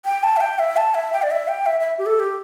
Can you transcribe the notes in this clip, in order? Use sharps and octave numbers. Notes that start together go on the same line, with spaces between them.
G5
A5
E5
G5
E5
A5
E5
G5
D5
E5
G5
E5
E5
G4
A4
G4